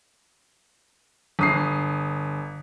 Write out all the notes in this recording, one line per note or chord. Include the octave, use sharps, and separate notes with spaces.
G1 D#6 C7